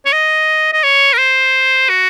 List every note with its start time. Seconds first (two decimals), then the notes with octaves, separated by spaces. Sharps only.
0.06 C#5
0.13 D#5
0.73 D#5
0.84 C#5
1.13 A#4
1.18 C5
1.89 F#4